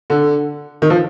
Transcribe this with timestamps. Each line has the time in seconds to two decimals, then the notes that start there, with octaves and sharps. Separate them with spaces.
0.10 D3
0.82 D#3
0.90 F3